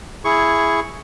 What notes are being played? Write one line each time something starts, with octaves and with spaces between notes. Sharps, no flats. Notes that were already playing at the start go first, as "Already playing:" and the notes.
E4 G#4 C#6